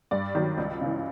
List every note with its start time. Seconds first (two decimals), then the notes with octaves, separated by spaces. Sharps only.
0.11 G2 D5
0.35 D#3 F#3
0.58 C#2
0.81 C#3 E3